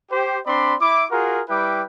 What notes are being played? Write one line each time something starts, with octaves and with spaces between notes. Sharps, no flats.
G4 C5
C4 D4 D5 B5 C6
E4 D6
F4 F#4 G#4 A#4
G3 E4 B4 G5 D6